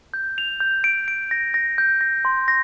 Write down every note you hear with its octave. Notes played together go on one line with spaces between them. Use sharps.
G6
F7
G6
D7
D7
A#6
A#6
G6
A#6
C6
A#6